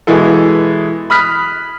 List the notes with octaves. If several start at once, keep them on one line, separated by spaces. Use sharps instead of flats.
B2 E3 G#3 E4 A4
B5 D#6 F6 F#6 B6